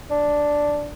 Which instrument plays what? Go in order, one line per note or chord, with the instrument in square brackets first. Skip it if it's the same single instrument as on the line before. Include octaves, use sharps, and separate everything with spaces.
[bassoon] D4